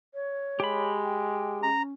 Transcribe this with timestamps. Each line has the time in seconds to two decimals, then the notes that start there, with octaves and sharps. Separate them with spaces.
0.14 C#5
0.60 G#3 G4 B5
1.03 G5
1.63 C#4 A#5